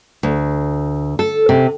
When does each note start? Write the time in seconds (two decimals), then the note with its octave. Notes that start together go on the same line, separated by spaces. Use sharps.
0.23 D2
1.19 A4
1.49 C3